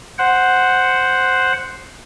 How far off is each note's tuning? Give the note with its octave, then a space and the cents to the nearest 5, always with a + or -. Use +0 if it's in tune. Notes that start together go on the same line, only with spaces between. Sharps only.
C5 +0 F#5 +0